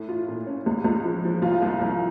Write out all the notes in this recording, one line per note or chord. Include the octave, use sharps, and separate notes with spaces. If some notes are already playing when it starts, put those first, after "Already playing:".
Already playing: A2 A3
F4
A#2
C#4
C#2
C#2
F3
F3
C2 F4 F5
C2
C2